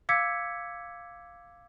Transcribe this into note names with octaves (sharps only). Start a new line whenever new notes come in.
F5 D6 E6 G#6 B6 C#7